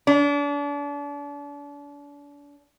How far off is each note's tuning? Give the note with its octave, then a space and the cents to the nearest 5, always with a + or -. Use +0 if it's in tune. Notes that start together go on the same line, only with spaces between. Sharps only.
D4 -35